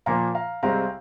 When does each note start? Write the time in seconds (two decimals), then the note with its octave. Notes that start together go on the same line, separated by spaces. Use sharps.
0.06 A#2 F3 A#3 F5 A#5
0.35 F5 A#5
0.63 C2 C3 G#3 C4 F5 A#5